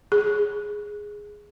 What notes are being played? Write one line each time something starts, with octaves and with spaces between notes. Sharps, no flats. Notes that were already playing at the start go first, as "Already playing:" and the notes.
G#4